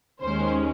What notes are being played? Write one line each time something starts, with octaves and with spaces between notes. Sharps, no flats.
D#2 D#3 G#3 C#4 C5